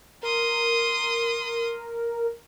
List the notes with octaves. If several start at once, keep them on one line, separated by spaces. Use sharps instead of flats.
A#4 C6 D#6